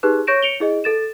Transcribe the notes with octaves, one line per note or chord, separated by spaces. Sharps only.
D#4 G4 G#4 B4 F#6
C#5 C#6 G6 A#6 D7 E7
C#7 D7 F7 G7
E4 G#4 D#5
A4 A6 E7